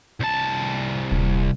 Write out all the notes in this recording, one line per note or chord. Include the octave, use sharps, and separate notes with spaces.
C2 A5
D#1